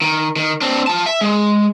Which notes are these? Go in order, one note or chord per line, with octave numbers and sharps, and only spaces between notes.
D#3
D#3
C4 D4
F4 A5
E5
G#3